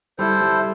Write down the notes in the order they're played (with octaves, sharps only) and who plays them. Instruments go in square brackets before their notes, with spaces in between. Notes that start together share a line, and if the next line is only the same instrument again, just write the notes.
[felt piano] G3 [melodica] E4 A4 C5
[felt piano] G3